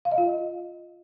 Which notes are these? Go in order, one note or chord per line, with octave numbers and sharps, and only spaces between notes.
F5
D#5
F4